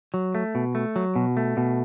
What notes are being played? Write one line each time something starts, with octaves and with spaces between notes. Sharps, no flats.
F#3
A3
B2
A3
F#3
B2
A3
B2